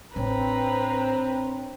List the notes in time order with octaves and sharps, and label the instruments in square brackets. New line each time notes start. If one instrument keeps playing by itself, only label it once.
[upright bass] A1 [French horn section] C4 [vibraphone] D4 C#5 G5 [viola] B4 A#5